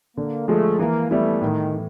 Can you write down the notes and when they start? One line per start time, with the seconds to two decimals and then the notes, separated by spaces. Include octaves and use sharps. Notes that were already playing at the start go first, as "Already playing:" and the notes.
0.17 D3 A#3
0.48 F3 G#3 A3
0.79 E3 A#3
1.10 G3 A3 B3 E4
1.41 A2 D#3
1.73 E3